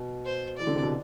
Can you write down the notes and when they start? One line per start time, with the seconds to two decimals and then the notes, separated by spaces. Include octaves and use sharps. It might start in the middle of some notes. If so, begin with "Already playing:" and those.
Already playing: B2
0.25 C5
0.58 E3 D5
0.67 D3
0.75 C3
0.83 B2